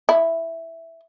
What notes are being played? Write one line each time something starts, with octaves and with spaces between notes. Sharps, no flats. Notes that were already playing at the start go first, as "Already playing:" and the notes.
E4